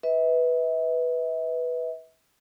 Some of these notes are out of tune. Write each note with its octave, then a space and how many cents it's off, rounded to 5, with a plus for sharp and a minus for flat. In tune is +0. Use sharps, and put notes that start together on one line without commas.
B4 +0 E5 -40